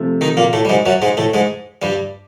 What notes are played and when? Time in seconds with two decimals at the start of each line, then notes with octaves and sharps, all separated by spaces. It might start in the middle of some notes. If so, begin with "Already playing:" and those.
Already playing: C3 F3 A3
0.21 D#3 D#4
0.37 A#2 A#3
0.53 A2 A3
0.65 G3
0.69 G#2 G#3
0.86 F#2 F#3
1.02 G#2 G#3
1.17 A2 A3
1.34 G#2 G#3
1.82 G2 G3